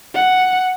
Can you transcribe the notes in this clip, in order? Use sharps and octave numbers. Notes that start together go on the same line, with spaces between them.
F#5